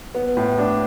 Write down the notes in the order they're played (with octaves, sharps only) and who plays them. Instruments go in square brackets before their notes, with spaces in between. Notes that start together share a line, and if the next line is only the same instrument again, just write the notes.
[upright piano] B3
A2
D4